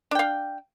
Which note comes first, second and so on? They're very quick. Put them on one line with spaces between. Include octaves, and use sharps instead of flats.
D4 G5 F5